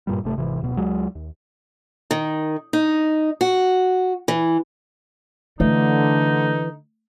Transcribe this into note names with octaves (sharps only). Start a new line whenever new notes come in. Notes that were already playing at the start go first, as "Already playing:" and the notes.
G2 A#2 G3
G1 C3 A3
G#1 C3 E3
D1 B2
C#2 F#3 G#3
D#2
D#3
D#4
F#4
E3
D3 E3 A3 D#4